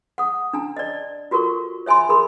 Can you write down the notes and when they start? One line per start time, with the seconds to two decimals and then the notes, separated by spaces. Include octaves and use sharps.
0.18 F#5 D#6
0.53 D4 A5 A#5
0.77 D5 D#5
1.31 F4 F#4 A4 A#4 C#6
1.86 C#5 E5 G#5 B5 C6
2.09 G#4 A#4 B5 C6